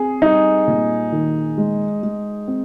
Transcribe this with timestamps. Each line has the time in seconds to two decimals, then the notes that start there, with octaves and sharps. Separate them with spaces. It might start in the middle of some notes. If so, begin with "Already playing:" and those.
Already playing: C4 G#4
0.22 G3 D#4
0.67 A#2
1.12 D#3
1.58 G#3
2.03 G#3
2.48 C4